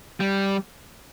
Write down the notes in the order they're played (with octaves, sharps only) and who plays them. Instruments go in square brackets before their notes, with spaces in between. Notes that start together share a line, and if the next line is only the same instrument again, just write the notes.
[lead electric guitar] G3